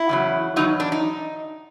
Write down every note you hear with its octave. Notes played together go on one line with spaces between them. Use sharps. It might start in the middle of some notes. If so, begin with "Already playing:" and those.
Already playing: E4
E2 C#3 F#3
E2 C#3 F#3 D#4
D4
D#4